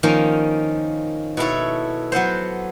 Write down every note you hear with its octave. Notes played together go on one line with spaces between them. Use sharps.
D#3 F3 A#3 C#4
B2 E4 A4 C#5
F#3 B3 A4 C5